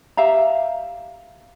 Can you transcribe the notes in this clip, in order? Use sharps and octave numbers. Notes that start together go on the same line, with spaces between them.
G4 E5 F5 A#5